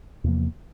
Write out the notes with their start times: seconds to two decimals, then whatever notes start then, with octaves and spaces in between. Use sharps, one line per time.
0.24 E2 C3 F3 A#3